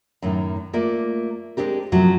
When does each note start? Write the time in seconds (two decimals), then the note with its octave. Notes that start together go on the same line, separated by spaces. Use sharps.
0.22 F#2 A2 D#3
0.73 A3 A#3 F4 D5
1.57 G#3 A#3 C4 D4 G4 A#4
1.92 F#2 A2 C3 F3 F#3